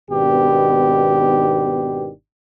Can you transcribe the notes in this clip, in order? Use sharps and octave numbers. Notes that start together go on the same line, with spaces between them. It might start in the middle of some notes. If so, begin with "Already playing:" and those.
G#1 B2 D#3 B3 D4 G4